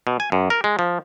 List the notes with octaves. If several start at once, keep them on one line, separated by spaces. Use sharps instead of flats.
B2
G#5
F#2
A#4
G#3
F3